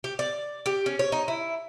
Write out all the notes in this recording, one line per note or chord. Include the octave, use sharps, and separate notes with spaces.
G4
D5
G4
C#4
C#5
D#4
E4